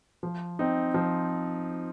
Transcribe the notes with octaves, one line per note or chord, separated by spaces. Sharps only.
F3
C4 D#4
F3